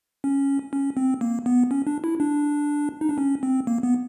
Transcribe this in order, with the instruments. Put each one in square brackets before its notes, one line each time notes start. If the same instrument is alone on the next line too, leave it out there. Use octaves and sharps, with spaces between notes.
[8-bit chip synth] C#4
C#4
C4
A#3
B3
C#4
D4
E4
D4
D#4
D4
C#4
C4
A#3
B3